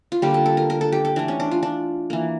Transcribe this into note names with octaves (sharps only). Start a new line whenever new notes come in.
F4
D3 G3 A#3 G4
A4
A4
A#4
A#4
A4
G4
A4
E3 A3 D4
C#4
D4
F4
D4
E3 A#3